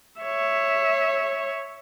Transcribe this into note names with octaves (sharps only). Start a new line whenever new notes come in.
C#5 E5